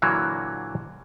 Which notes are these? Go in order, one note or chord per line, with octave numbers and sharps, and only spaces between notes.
A#2 D3 E3 F#3 A#3